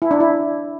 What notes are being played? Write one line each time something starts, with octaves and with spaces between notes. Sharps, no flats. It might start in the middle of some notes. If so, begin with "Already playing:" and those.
E4
D4
E4